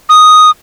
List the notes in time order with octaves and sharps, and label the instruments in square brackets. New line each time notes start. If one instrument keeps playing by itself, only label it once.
[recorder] D#6